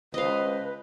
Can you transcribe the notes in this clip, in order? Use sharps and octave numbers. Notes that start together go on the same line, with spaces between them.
C#2 B4 C5 D#5 F5